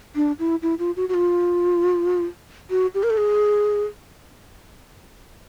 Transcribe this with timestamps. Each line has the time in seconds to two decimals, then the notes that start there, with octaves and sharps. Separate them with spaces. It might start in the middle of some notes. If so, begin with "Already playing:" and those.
0.16 D4
0.39 E4
0.62 E4
0.79 F4
0.96 F#4
1.09 F#4
1.14 F4
2.70 F#4
2.94 G4
3.03 A#4
3.10 A4
3.17 G#4